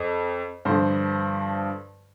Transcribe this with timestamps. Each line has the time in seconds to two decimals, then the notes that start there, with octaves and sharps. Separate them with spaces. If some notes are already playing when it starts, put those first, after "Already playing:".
Already playing: F2
0.65 G2 D3 F3 C5